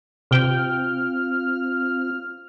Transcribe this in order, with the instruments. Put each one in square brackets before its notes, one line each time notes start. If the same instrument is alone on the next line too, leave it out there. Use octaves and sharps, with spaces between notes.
[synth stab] C3 G5 [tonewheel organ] C4 F4 [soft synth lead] F6